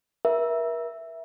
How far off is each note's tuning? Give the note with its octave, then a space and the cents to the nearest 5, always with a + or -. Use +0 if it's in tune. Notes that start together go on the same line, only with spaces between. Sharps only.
A#4 +40 E5 +0